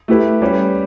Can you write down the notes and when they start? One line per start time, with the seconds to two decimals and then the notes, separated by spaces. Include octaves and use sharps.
0.08 A3 E4 G4 B4
0.42 G3 C#4 G4 B4